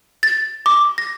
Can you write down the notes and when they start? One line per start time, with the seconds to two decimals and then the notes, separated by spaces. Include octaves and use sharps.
0.23 A6
0.66 D6
0.98 A#6